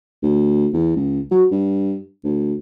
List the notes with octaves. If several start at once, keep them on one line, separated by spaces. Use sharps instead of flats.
D2
E2
C#2
F#3
G2
D2